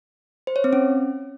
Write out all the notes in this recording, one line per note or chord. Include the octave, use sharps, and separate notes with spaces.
C5
C#5
C4
C#4